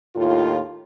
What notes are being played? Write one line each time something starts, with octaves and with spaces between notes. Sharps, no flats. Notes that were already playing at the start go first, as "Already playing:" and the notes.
D#2 A2 F4